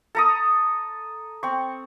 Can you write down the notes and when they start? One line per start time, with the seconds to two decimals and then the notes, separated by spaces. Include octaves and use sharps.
0.15 A4 A#5 D#6
1.43 C4 C#6